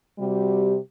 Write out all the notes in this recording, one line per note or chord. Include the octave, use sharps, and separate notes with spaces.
C3 G3 F#4 G4